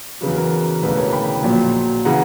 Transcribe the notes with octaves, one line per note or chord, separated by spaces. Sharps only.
E2 C#3 F#3 B4
A#4
E1 D2 C#3 E3 B4
A#4 C#5
G5 B5
A#1 A#2 F#3
C#3 E3 F#5 A#5